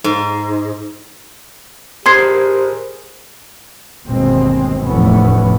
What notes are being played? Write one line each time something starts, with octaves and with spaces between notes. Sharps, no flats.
G#2
G4 G#4 A#4 C5 C6 G#6 C7
G1 D#2 B2 G#3 C4
F1 E2 A2 E3 B3 C#4